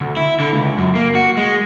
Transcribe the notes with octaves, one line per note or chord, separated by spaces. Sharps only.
D2
E4
D3
C#2
F#2
A#3
F#4
G#3